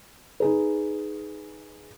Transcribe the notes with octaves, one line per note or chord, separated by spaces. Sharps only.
D#4 G#4 B4